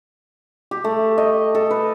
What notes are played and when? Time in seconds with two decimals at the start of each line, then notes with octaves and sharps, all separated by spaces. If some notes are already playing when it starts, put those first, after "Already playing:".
0.71 G4
0.84 A3
1.18 D#5
1.55 A4
1.71 B4